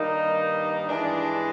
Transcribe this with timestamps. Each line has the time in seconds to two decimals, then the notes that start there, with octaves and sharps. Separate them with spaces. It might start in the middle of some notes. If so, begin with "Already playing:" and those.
Already playing: G2 D#3 G3 A#3 D#4
0.87 G2 E3 G#3 D4